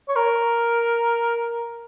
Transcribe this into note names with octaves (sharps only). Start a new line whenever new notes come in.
C#5
A#4